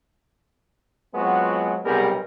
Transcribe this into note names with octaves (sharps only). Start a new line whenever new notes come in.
F#3 G#3 B3 C4 F4 F#4
B1 C3 G3 B3 G#4 A#4